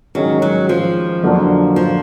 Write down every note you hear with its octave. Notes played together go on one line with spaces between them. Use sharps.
D#3 F#3 G#3 C#4
F#3
F3
F2 D3 F#3 A#3 D4
F3